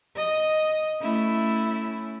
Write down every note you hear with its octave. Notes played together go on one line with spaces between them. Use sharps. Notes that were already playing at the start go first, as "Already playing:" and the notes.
D#5
A3 C#4 E4